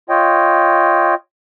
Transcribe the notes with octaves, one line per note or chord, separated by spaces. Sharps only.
F4 C#5 D#5 G5